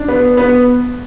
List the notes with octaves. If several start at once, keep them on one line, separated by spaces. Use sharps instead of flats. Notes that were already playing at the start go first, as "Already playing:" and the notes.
Already playing: D4
B3
B3